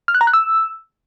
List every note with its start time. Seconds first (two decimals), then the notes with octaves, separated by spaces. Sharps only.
0.08 F6
0.14 F#6
0.21 A#5
0.27 F#6
0.33 E6